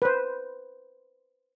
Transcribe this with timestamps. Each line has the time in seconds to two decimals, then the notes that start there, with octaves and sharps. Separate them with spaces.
0.02 B4 C5